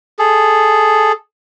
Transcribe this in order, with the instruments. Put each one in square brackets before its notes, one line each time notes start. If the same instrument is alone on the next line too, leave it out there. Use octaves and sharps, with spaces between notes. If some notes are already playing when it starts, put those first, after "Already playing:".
[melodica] G#4 A4